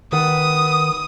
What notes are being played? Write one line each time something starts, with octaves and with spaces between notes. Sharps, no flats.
D#3 B4 F#5 D#6